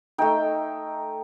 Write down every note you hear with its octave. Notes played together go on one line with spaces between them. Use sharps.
A3 D#4 G5